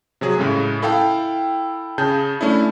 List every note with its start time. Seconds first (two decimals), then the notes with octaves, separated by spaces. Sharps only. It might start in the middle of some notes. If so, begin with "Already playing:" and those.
0.21 C3 F#3 G#4
0.38 A2 C#3 G#3 A3
0.82 E4 A4 F5 G5
1.98 C#3 G#4 A5 G6
2.41 A3 C#4 D4 E4